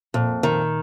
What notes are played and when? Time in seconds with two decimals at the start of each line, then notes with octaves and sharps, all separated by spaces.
0.14 F2 A#2
0.43 D#3